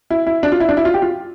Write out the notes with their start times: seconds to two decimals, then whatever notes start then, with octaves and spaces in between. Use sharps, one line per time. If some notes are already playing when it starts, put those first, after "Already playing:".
0.10 E4
0.27 E4
0.43 D4
0.52 F4
0.60 E4
0.69 D4
0.77 E4
0.85 F4
0.94 G4
1.02 F4